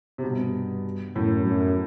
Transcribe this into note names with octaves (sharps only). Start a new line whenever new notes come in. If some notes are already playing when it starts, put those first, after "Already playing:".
C3
G2 B2
F#2 A2
F#2